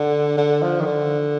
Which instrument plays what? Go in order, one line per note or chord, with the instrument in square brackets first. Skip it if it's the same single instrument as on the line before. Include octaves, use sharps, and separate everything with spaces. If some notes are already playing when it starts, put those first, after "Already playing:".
Already playing: [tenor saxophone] D3
D3
F3
D#3
D3